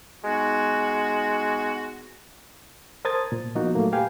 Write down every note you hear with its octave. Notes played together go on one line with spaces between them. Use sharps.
G#3 B3 D#4 F#4
A#4 C5 A5 D#6 G#6 A6
A#2
F3 A#3 B3 D#4 F#4
A#2 F#3 A3 A#3
G4 B4 F5 G5 G#5